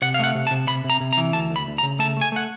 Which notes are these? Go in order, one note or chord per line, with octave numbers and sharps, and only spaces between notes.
C3 F#5
F5
A3 F#5
C3
A5
C3
C3 B5
C3
A#5
C3
A#5
E3
D2 A5
D2
B5
D2
A#5
C#3
A3 A5
A3 G#5
A3 F#5